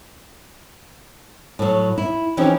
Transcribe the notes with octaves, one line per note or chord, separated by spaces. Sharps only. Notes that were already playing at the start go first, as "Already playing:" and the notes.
A2 F#3
E4
E3 F3 C4 C#4 D#4 G4